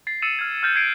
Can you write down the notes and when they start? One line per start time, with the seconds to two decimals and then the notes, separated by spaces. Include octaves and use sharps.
0.07 A6 C7
0.22 E6 A6 C#7 D#7 E7
0.39 F6 G#6
0.63 F6 G6 A6
0.76 G#6 C7 D7 D#7